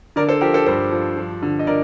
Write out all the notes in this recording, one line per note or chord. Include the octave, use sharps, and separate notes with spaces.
D3 A#4 D5
A4 C5
F3 G4 A#4
A4 C5
G2 A4 C5
F3
F3
D3
D#5
D3 A#4 D5